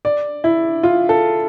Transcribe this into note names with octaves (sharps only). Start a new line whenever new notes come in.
D5
E4
F4
A4